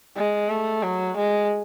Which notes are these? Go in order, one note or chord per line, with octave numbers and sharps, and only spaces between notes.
G#3
A3
F#3
G#3